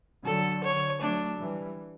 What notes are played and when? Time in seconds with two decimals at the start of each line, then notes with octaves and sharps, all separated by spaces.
0.25 D3 F#3 A4
0.64 C#5
1.01 F#3 A3 D4
1.39 E3 G3